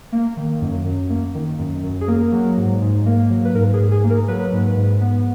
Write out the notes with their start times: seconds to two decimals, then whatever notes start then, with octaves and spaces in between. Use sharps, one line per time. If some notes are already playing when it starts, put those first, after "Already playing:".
0.12 A#3
0.37 D#3
0.62 F#2
0.86 F#2
1.10 A#3
1.35 D#3
1.59 F#2
1.83 F#2
2.01 G#4
2.08 A#3 A#4
2.32 F#3
2.57 G#2
2.81 G#2
3.06 A#3
3.30 F#3
3.45 B4
3.54 G#2 A#4
3.74 G#4
3.79 G#2
3.91 G#4
4.04 A#3
4.10 A#4
4.28 F#3 B4
4.53 G#2
4.77 G#2
5.01 B3